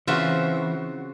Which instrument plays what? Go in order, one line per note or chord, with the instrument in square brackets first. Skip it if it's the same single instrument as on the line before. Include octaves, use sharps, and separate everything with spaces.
[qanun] C#3 C4 E5 [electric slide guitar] E3 [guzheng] F4 F#4